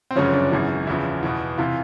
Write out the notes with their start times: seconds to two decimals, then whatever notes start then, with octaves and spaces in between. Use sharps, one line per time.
0.11 C4
0.15 G1 F#2 C#3 F3 C#4
0.33 D4
0.52 G#1 F#2 C#3 E3
0.87 E2 C#3 F3 E4
1.23 E2 B2
1.58 C3 E3 F4